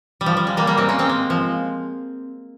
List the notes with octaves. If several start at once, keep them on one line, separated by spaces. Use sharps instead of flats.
G3
F3
G3
G#3
G3 A#3
G3 A#3
G#3 C4
A#3 C#4
G#3 C4
G#3
F3